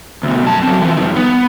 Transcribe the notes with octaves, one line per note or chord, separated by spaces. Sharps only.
D2 B2
F#2 A5
F#3 C4
E3 F3
G2 D#3
B3